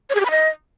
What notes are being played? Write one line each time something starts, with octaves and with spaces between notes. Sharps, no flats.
C#5
G#4
G4
B5
D#5